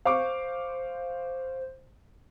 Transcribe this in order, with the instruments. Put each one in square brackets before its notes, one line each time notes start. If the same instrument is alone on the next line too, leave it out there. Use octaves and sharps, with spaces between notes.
[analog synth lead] C5 [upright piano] F5 C#6 D6